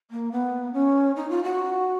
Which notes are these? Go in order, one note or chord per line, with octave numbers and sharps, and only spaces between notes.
A#3
B3
C#4
D#4
F4
F#4